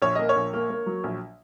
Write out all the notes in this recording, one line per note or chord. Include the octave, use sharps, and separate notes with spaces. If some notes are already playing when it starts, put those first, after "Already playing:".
A#1 C#5
A#3 D#5
C#5
A#1
A#3
A#3
F#3
A#1